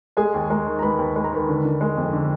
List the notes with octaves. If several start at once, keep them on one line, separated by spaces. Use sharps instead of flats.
G#3 G#4 G#5
D#2
G#3 A#4 A#5
D#3
A#5
G#3 B4 B5
D#2
G#3 B5
A#5
D#3 B4 B5
D3
D3
G#3
F2
D3